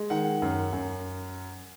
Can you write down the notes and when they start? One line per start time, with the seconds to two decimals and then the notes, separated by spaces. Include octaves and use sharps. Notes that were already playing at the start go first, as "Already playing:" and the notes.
Already playing: G#3
0.10 D#3 F#5
0.42 F#2
0.73 F#2